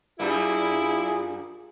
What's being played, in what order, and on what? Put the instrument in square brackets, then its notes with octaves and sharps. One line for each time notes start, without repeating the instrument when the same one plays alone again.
[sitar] F#2 G3 A#3 [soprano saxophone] E4 [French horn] F4 [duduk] G#4